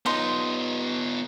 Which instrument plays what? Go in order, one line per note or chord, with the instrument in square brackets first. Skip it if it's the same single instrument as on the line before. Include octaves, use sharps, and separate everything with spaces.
[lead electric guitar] B3 F4 [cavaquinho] D#4 C6